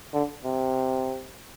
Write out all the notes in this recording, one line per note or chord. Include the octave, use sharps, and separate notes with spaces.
D3
C3